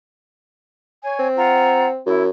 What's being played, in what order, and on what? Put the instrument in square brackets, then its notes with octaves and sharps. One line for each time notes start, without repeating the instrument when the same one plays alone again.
[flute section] C#5 G#5
[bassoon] C4
[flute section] F4 F#5 A#5
[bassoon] F#2 [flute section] E4